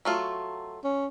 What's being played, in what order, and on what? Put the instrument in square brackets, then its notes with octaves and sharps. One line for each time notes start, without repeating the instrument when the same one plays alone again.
[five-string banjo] F#3 A3 F4
[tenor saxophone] C#4